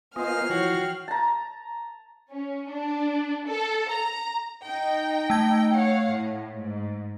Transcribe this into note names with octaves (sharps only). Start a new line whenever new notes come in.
A#3 B3 F4 C5 D#5 G#5 F6 C7
E3 F3 F#4 C#5 G5
A5 A#5
C#4
D4
A4
A#5
D#4 G5
A3 G#6
C#5 F5 F#5
A2
G#2